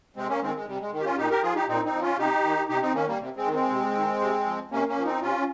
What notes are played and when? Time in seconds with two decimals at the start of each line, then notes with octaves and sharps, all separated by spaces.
0.16 C3 G#3 C4
0.29 A#3 C#4
0.41 D#3 G#3 C4
0.54 G#3
0.67 C3 G3
0.80 G#3
0.92 D#3
1.00 G4
1.05 C#4 F4
1.17 A#2 D#4 G4
1.30 G4 A#4
1.42 F3 F4 G#4
1.55 D#4 G4
1.68 A#2 C4 D#4
1.85 C4 D#4
1.93 F3
2.02 C#4 F4
2.18 C3 D#4 G4
2.44 D#3
2.69 C3 D#4 G4
2.81 C4 D#4
2.94 D#3 A#3 C#4
3.07 G3 A#3
3.19 C3
3.36 G#3 C4
3.45 D#3
3.53 G#3 C4
3.70 C3
3.95 D#3
4.21 C3
4.46 F3
4.71 C3 A#3 C#4
4.88 A#3 C#4
4.97 F3
5.05 C4 D#4
5.22 C3 C#4 F4